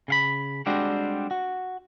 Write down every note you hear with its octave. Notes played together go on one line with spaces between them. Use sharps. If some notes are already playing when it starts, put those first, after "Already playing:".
C#3 F5 B5
G3 G#3 C4 D4 F#4
F#4